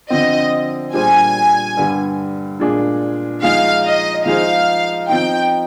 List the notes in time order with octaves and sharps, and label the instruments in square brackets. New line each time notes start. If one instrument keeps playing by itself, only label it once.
[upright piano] D3 F3 C4 [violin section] D#5
[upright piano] A#2 G3 D4 G#4 C5 [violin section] G#5
[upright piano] G2 D3 G3
A#2 G#3 D4 G#4
[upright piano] F3 G#3 D#4 G#4 [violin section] F5
[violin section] D#5
[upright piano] F3 G#3 D#4 G#4 C5 [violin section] F5
[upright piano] F3 C4 D#4 [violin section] G5